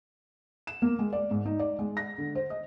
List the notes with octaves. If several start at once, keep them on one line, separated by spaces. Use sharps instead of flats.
E7
A#3
G#3
D5
G#2
D#4
D5
G#3
A#6
D3
C5
D#5